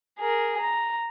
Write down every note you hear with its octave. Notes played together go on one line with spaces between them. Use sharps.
G#4 A#4
A#5